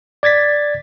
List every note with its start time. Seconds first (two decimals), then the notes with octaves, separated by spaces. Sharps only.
0.23 D5 G#6 A6 B6